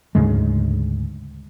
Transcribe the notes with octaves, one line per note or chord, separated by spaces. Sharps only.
D2 G#2 C#3 G#3